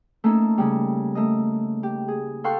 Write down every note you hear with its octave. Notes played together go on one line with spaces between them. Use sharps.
A3 A#3 C#4 D#4 A4
C#3 G3
A3 A#3 D#5
G4
G#4
A4 F5 G5 C6 C#6 F#6